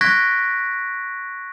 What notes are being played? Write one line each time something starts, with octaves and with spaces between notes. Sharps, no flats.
C#6 F#6 G#6 A#6 B6 D7